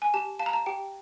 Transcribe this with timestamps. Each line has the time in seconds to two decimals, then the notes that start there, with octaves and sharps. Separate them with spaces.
0.02 G#5
0.14 G4 A5
0.39 F5 A5
0.46 A#5
0.53 A5
0.66 G4 G5